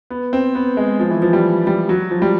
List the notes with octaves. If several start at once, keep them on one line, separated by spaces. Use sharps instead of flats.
B3
C4
B3
G#3
F3
E3
F3
G3
G3
F#3
F3
G3